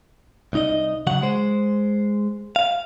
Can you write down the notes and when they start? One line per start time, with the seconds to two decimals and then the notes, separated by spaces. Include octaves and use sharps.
0.53 C2 D#4 D#5
1.07 C#3 F#3 F#5
1.22 G#3 C5
2.56 F5